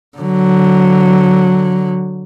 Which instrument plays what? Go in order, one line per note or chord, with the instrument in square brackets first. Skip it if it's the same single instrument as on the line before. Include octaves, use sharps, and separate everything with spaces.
[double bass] D3 F#3